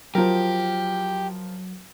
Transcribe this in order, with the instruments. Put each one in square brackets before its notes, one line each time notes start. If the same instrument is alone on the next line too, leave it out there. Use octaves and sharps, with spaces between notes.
[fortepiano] F3 A#4 [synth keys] F#3 [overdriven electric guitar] G4